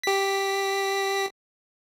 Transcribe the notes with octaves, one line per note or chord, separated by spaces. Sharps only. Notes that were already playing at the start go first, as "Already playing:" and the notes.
G4 B6